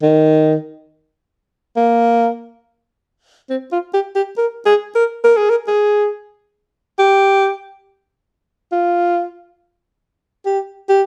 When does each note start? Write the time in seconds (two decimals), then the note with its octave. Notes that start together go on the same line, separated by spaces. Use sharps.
0.03 D#3
1.77 A#3
3.50 C4
3.72 F4
3.94 G4
4.16 G4
4.38 A#4
4.66 G#4
4.96 A#4
5.24 A#4
5.37 G#4
5.50 A#4
5.68 G#4
6.99 G4
8.72 F4
10.46 G4
10.89 G4